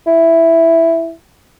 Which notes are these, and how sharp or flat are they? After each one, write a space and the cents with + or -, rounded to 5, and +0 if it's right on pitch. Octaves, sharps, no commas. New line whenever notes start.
E4 +5